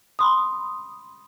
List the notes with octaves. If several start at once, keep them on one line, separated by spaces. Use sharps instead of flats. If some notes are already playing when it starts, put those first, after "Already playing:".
B5 C6 D#6